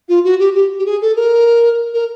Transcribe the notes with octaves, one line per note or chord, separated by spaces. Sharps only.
F4
F#4
G4
G4
G4
G#4
A4
A#4
A#4